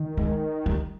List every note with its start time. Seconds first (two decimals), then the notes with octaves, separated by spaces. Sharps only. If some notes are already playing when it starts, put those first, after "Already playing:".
Already playing: D#3
0.17 G#3
0.66 G3